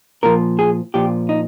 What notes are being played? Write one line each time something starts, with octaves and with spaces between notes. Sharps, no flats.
A#2 F3 A#4
G#4
A#2 F3 G4
D#4